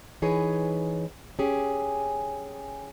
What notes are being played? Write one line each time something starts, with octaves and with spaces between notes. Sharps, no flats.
E3 D#4 G#4 B4 C#5
C#4 G4 G#4